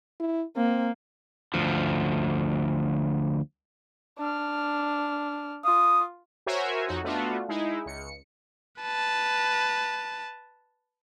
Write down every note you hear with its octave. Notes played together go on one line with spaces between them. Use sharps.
E4
A#3 C4
D2 F3
D4 F6
F4 D#6
F#4 A#4 C5 C#5 E5 G#5
F2 D#4 F#4
A3 B3 D4 F4 F#4
G#3 D#4 E4
C#2 C#7
B4 A5